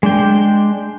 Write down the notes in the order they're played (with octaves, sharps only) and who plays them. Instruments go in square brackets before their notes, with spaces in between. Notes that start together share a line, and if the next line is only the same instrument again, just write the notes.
[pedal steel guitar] G#3 D4 G5